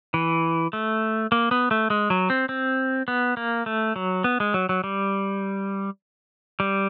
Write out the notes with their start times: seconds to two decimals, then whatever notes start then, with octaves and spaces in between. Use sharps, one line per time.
0.14 E3
0.73 A3
1.32 A#3
1.51 B3
1.71 A3
1.90 G#3
2.10 F#3
2.30 C4
2.49 C4
3.08 B3
3.37 A#3
3.66 A3
3.96 F#3
4.24 B3
4.40 G#3
4.54 F#3
4.69 F#3
4.84 G3
6.60 G3